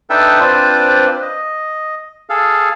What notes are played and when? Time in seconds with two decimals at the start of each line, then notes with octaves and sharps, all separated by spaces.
0.10 D4 D#4 A4 B4 E5 G5
0.40 C4 D4 F4 B4 C5 D5
1.22 D#5
2.30 G#4 A4 F5